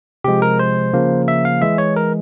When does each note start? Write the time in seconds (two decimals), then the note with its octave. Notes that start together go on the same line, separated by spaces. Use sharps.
0.24 C3 F3 G#3 G4
0.42 A#4
0.59 C5
0.93 C#3 F3 A#3
1.28 E5
1.45 F5
1.62 E3 G#3 E5
1.78 C#5
1.96 A#4